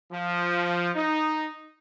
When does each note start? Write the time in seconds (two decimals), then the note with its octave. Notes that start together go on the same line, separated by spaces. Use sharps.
0.12 F3
0.95 D#4